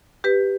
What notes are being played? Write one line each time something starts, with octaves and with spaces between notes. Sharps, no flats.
G4 B4